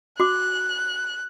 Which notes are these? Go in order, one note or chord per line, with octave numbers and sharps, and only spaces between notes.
F#4 D6 F#6